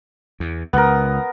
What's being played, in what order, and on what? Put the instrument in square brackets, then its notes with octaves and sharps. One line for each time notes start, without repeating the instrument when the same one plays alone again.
[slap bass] E2
[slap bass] C#2 [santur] B3 A#4